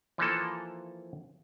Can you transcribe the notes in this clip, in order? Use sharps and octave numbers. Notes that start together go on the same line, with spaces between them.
E3 F3 A#3 A4